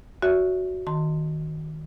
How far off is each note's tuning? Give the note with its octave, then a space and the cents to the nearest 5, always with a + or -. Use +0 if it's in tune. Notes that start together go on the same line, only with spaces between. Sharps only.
F#4 +0 C#5 +45 E5 +0
D#3 +0 A5 +30 C6 +0